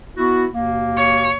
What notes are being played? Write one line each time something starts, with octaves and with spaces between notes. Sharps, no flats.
B3 E4 F#4
D#2 B2 A#3
C#5